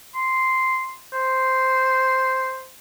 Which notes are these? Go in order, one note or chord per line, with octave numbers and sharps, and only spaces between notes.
C6
C5